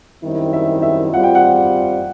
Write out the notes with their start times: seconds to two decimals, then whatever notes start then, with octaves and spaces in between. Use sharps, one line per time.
0.23 F#2 D#3 G3 C4 E4
0.53 E5
0.82 E5
1.13 G3 C4 F4 F#5
1.23 G5
1.35 F#5